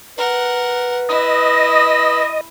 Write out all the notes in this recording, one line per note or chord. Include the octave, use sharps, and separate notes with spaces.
A#4 B4 F#5
E4 D#5